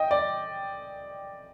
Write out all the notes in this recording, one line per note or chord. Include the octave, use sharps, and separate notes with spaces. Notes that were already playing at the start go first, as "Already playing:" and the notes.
Already playing: D#5 G5
D5